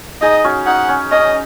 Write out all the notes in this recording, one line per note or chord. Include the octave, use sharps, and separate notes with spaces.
D#4 G#4 D#5
C#4 F#4
D#4 F#5
C#4
C#4 D#5